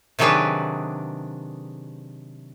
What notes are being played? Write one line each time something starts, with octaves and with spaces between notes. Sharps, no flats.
C3 D#3 F#3 D4 G#4 B4